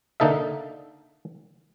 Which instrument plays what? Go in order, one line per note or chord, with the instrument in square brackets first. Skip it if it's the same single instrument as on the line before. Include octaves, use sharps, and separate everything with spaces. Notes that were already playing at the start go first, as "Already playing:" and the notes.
[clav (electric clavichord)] D3 A#3 D#4 A4 E5